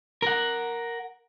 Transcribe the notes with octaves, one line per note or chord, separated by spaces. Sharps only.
A#4 F#5